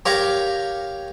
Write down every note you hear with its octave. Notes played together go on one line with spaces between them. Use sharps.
G4 A#4 C#5 F5